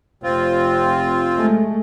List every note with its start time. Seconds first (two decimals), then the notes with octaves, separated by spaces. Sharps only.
0.23 F1 C4 F4
1.36 G#3 A3